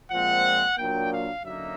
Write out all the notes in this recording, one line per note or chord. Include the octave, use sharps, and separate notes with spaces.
A#2 F3 G#3 C4 F#5
A#2 F#3 A#3 D4 G5
F5
F#2 D3 F#3 A#3 D#4 E5